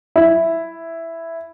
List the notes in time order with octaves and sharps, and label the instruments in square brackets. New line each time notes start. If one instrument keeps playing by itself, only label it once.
[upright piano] E4